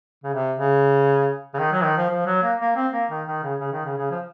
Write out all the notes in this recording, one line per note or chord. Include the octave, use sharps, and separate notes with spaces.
C#3
C3
C#3
C#3
D#3
F#3
D#3
F3
F3
F#3
A#3
A#3
C4
A#3
D#3
D#3
C#3
C#3
D#3
C#3
C#3
F3